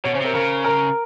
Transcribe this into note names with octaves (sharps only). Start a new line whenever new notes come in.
B2 C#5
C#3 C5
C3 A#4
C#3 A#4
A#4